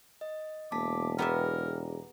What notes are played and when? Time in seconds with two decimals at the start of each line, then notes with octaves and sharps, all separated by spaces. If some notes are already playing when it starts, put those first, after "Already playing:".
0.21 D#5
0.72 E1 A#3 A5 D6 B6
1.18 B3 E4 G4 G#4 A#4 E5 A#5